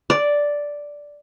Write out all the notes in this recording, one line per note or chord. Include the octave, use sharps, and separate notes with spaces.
D5